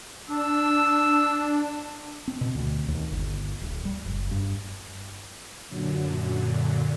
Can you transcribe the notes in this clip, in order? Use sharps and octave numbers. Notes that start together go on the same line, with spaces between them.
D4 E6
C4
B2
D2
D#2
G1
D1
G3
F#1
G2
F#2 A#2 D3 F#3